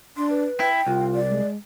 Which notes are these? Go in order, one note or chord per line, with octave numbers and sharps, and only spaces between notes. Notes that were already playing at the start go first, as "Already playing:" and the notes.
D4 C6
B4
E4 G5
C2 F4
D5
G#3